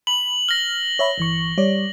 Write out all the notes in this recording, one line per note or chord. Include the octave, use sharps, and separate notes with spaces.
B5 F#7
F6 A#6 G7
C#5 E5 B5
G1 E3 C#6
G3 C#5 D5